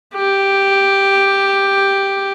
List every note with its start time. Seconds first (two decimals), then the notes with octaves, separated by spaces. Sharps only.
0.15 G4